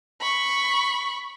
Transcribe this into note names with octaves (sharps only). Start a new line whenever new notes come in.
B5 C#6